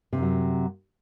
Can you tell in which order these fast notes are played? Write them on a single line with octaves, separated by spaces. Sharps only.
C3 F#2 F#3